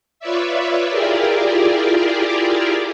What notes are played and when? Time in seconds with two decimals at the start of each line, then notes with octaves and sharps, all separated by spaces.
0.20 F4 B4 C#5 D5 E5
0.88 E4 F4 G4 G#4 A#4 D5